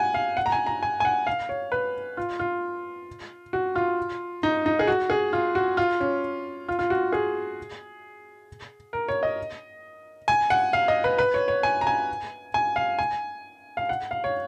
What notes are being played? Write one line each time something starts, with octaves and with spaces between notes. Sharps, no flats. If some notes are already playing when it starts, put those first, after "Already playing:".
Already playing: F#5 G#5
F5
F#5
A#5
G#5
A#5
G#5
G#5
F#5
F5
C#5
B4
F4
F4
F#4
F4
D#4
D#4
G#4
F#4
G#4
F4
F#4
F4
C#4
F4
F4
F#4
G#4
A#4
C#5
D#5
G#5
F#5
F5
D#5
B4
B4
C#5
C#5
G#5
A#5
G#5
G#5
F5
G#5
F5
F#5
F5
C#5